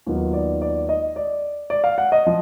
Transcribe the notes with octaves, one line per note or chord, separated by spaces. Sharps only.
D#2 D#3 F#3 B3 F4
D5
D5
D#5
D5
D5
F5
F#5
D#5
F3